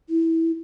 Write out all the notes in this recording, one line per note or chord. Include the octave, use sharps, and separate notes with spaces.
E4